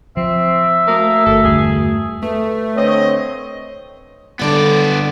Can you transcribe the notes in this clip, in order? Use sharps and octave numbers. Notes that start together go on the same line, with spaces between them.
F3 C4 E5
A3 A#3 F#4 D#6
G1 A4
E2 G2 D3 G#4
A3 B4
D3 C4 C#5 D#5
G2 D3 B3 A4 D5